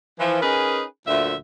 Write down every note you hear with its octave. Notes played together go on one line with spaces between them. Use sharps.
E3 F3
C#4 D#4 G#4 A#4 B4
D2 A#2 F3 E5